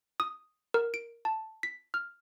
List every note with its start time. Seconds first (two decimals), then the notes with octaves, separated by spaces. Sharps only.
0.20 D#6
0.74 A#4
0.94 D7
1.25 A5
1.63 B6
1.94 F6